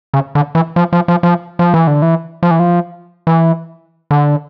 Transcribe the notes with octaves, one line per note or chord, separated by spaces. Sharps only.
C#3
D3
E3
F3
F3
F3
F3
F3
E3
D3
E3
F3
E3
F3
E3
D3